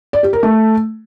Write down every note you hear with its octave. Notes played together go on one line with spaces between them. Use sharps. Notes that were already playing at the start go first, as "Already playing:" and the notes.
D5
G4
A#4
A3